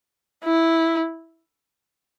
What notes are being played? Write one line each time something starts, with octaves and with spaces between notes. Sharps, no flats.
E4